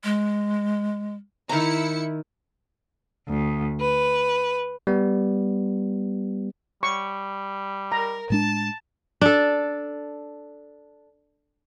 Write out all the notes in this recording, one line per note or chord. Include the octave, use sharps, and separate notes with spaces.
G#3
D#3 E4 A#5 C#7
D2
B4
G3 B3
G3 C#6
A#4 A#5
A2 G#3 D4 A5
D4 A4